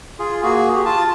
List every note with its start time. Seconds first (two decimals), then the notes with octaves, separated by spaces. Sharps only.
0.19 F4 G#4
0.43 A#3 F#4 G#4
0.74 G4
0.85 F4 A5